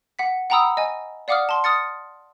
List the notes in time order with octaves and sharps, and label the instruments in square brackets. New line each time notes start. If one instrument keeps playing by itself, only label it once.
[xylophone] F#5 B6
F#5 G5 A#5 B5 D#6 E6
D#5 G#5
D5 F5 F#5 D6 D#6 F6
A5 C6
D#6 F6 A6 C#7